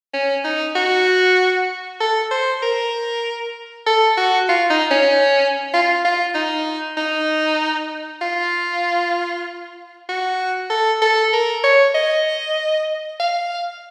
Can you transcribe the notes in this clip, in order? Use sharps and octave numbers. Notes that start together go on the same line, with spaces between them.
C#4
D#4
F#4
A4
C5
A#4
A4
F#4
F4
D#4
C#4
F4
F4
D#4
D#4
F4
F#4
A4
A4
A#4
C#5
D#5
F5